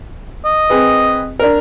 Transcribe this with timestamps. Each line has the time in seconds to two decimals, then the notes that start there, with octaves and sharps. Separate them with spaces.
0.45 D#5
0.70 C4 G#4 B4
1.39 D4 A#4